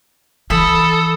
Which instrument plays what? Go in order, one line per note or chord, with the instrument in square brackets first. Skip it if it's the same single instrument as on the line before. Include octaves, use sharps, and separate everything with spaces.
[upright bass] E3 [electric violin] A4 [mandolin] B5 E6 [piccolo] D#6